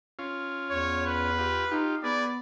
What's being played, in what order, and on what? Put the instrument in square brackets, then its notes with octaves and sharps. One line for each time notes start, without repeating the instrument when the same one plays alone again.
[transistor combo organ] C#4 F4
[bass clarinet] E2 [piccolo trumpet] C#5
[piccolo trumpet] B4
[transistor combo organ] F4 G4
[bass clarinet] D#4 [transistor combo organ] F4 G4
[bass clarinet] B3 [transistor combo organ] G#4 B4 [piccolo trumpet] D5